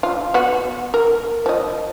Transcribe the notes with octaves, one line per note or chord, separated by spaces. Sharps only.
F4
B3 F#4
A#4
F3 D#5